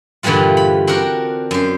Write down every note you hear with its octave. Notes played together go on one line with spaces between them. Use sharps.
G2 A#2 D3 E3 G3 F4
B5
C4 D4 F#4 A#4
F#2 C5